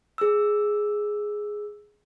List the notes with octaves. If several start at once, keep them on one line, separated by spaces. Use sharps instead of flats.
G#4 E6